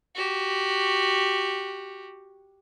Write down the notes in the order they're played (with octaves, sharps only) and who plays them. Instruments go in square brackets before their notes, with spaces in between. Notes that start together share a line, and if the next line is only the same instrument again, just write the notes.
[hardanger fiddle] F#4 G4